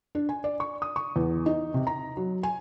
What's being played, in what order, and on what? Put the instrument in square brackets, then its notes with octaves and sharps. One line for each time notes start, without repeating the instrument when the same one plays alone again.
[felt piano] D4
G#5
D5
C#6
D#6
C#6
E2
D#4
C3
A#5
F#3
G#5